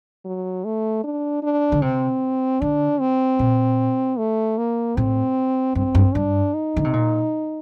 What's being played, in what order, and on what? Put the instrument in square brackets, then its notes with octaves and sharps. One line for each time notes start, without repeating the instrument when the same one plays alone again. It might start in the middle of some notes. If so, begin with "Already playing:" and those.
[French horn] F#3
A3
D4
D4
[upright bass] D3
[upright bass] C3 [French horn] C4
[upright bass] D3 [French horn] D4
[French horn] C4
[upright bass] A#2
[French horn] A3
A#3
[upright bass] A2 [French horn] C4
[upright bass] G2 [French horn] C4
[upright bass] G2
[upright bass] G2 [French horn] D4
[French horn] D#4
[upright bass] D3
C3
A#2